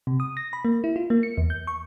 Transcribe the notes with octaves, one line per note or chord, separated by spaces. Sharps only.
C3
D#6
A#6
B5
A#3
E4
F4
A#3
C#7
E2
G6
C#6